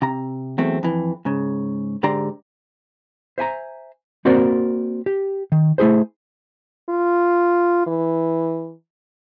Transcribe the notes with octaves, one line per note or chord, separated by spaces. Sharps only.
C3 A#5
E2 F#3 A3 C4
F2 E3
G#2 C#3
G#2 D3 G4 D5 A#5 C6
C5 E5 G#5 A#5
A#3 C4 F#4 A#4 C5 D5
G4
D#3
A3 E4 G#4 C5
F4
E3